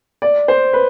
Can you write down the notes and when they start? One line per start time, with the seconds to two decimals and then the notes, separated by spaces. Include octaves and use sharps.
0.22 D5
0.48 C5
0.73 B4